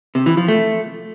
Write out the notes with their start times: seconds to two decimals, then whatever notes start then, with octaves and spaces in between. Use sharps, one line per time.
0.15 C3
0.26 E3
0.37 F3
0.48 A3